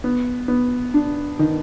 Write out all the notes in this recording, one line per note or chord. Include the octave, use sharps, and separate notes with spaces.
B3
B3
D4
D#3